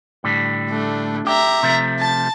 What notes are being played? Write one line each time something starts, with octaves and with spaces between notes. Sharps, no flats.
A2 D3 G3
A3 D4
G4 E5 A#5
C3 F3 A3
A5 A6